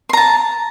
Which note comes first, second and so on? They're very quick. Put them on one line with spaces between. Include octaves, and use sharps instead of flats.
C6 A#5 A5